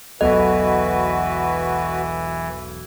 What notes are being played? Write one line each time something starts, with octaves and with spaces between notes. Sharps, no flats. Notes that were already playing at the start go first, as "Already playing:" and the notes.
E1 B1 E3 F#4 A4 B4 D#5